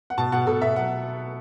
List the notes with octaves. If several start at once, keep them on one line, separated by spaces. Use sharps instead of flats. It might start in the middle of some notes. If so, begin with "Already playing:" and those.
F#5
B2 A5
B2 F#5
B2 A4
B2 E5
F#3 F#5